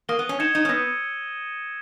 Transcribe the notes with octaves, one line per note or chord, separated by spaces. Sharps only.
A#3 D#6 A#6 D#7 G7
B3
C#4
D#4 G#6 C#7 E7 G7
D#4
C#4
B3 E6 A#6 D#7